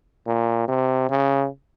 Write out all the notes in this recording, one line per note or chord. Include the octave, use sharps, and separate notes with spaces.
A#2
C3
C#3